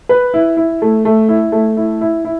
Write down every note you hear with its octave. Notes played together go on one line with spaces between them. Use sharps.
B4
E4
E4
A3
A3
E4
A3
E4
E4
E4